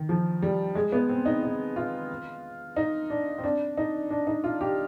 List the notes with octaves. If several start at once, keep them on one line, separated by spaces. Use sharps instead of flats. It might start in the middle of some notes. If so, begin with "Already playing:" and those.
Already playing: D#3
F3
G3
G#3
B3
C4
D#4
D#4
F4
D#4
D4
C4
D4
D#4
D4
D#4
F4
G4